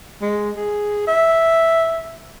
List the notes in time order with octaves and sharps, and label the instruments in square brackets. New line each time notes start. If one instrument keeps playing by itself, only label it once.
[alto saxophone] G#3
G#4
E5